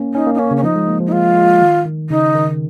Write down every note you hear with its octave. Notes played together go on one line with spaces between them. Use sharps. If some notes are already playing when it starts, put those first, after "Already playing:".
Already playing: A#3 C#4
C#4 D#4
A#3
D#4
A#3 C#4
C#3
C#4
F3 D#4
G#3
A#3
F3
D#4
G#3 F4
G#3
D#3
D#3
C#3 D#4
D#3